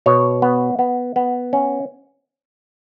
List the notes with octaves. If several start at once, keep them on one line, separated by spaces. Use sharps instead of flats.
B2 C#5
B3
B3
B3
C#4